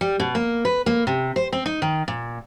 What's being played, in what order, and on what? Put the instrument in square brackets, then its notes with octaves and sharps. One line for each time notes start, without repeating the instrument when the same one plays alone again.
[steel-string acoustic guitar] G3
B2
A#3
B4
A#3
C3
C5
C4
D#4
D#3
A#2